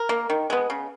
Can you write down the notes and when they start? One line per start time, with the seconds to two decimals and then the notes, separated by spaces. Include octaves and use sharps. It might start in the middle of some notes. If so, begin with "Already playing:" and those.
Already playing: A#4
0.09 A#3
0.30 D#3
0.50 G#3 B3
0.70 C#3